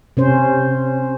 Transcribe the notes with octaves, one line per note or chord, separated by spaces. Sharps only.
C3 C#4 C5